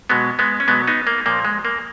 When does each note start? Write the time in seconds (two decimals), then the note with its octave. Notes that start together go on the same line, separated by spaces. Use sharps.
0.10 B2 F#3 G#3 B3
0.39 G#3 B3
0.60 C#4
0.68 B2 F#3 G#3 B3
0.87 B3 D#4
1.07 A#3
1.26 A#2 F3 A#3
1.45 G#3
1.65 A#3